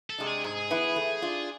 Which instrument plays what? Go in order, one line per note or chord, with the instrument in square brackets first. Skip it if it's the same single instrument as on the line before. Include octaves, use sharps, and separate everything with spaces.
[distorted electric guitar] A4
[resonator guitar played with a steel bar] C3 G#3 D4
[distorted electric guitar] G#4
[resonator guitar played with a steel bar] G#2 [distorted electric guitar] G#4
[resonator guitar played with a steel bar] E3 B3 E4 B4
A3
D4 F4